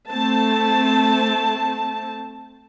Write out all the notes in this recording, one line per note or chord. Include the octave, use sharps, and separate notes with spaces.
A3 C4 A5